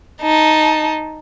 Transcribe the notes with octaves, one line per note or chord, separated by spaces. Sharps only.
D#4 A5